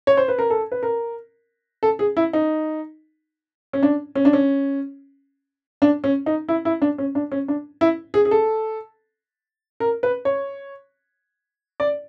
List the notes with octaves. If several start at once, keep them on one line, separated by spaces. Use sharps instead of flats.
C#5
C5
B4
A#4
A4
B4
A#4
A4
G#4
E4
D#4
C#4
D4
C#4
D4
C#4
D4
C#4
D#4
E4
E4
D4
C#4
D4
C#4
D4
E4
G#4
G#4
A4
A#4
B4
C#5
D5